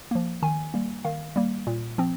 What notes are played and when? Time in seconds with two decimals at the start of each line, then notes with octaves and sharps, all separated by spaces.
0.11 F3 A#3
0.42 D#3 G#5
0.74 G3 A#3
1.05 D#3 F5
1.36 G3 A#3
1.67 A#2
1.98 F3 C4